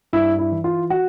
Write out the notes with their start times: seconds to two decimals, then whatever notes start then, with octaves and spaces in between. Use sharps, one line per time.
0.13 G2 E4
0.39 E4
0.52 E3
0.64 F4
0.90 F#4